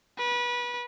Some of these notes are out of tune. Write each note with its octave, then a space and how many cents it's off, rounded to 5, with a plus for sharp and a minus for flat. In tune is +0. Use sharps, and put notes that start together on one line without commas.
B4 -25